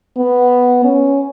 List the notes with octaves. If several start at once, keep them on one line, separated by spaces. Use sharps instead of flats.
B3
C#4